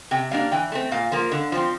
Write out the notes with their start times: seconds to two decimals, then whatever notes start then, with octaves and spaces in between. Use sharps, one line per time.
0.11 C3 G5
0.31 G3 A#3 D4 F5
0.51 E3 G5
0.72 A3 C4
0.92 A#2 F5
1.12 F3 A#3
1.32 D3
1.52 F3 C4